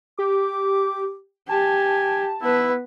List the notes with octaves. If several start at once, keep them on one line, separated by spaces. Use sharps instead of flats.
G4 D6
G4 G#5 A5
B3 E4 B4